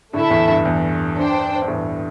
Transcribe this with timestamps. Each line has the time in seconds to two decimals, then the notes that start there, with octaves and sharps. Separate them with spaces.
0.13 A2 D3 A3 E4 A4 E5
0.31 E2 A2
0.48 G2
0.65 E2
1.17 D4 C5 G5
1.62 G2
1.68 E2 A2